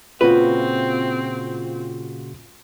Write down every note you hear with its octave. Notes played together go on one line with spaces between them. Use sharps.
A#2 C#3 C4 F4 F#4 B4